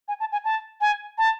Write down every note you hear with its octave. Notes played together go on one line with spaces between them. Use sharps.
G#5
A5
G#5
A5
G#5
A5